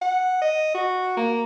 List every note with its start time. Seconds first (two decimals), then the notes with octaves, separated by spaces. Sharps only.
0.01 F#5
0.42 D#5
0.74 F#4
1.17 A#3